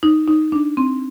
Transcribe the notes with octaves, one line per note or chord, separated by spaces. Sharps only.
D#4
D#4
D4
C4